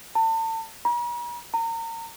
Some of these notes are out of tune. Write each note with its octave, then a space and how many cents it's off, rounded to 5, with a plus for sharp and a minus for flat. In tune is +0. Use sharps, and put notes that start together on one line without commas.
A5 +35
A#5 +45
A#5 -30